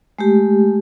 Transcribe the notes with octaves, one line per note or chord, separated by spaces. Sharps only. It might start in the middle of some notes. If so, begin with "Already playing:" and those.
G#3 A3 G4